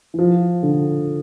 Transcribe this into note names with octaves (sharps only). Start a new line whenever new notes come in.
E3
F3
D3